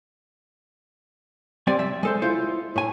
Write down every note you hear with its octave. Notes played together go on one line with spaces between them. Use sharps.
G3 C4 D5 G#5
E5
G#3 A4 C5
E4 F4 C5
A2 G#5